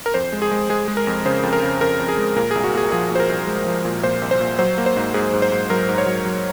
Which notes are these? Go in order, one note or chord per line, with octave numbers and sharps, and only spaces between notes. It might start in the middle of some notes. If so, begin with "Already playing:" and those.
A#4
F2 C5
G#3
G#4
G#3
G#3 G#4
G#3
A#4
F2
C#3 C5
F2
A#4
C#3
F2 A#4
F2
G#4
G#3
A#2 A#4
C2 G#4
F#4
A#2 G#4
F3 G#4
A#2 C5
A#4
C2
G#3
F3
A#2
A#2 C5
C2
C5
A#2
F#3 C5
A#3
C5
G#2
G#2 G#4
G#2
C5
G#2
F#3 A#4
G#2
C#5
F#3
F#3